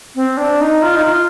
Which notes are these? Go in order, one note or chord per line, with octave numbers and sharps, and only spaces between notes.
C4
D4
D#4
F4
D#4
F4